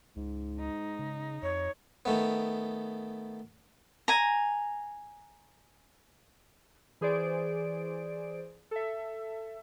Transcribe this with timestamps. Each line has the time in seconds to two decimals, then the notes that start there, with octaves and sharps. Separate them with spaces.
0.16 C#2 G#2
0.60 D#4
0.99 C#3
1.43 F2 C#5
2.05 D#3 A3 B3
4.08 G#5 A#5
7.01 E3 G#4 C5 D5 D7
8.71 A4 E5